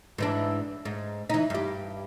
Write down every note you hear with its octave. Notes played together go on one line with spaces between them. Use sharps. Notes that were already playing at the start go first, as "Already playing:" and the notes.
G#2 E3 D4
G#2
E3 D#4
G2 G4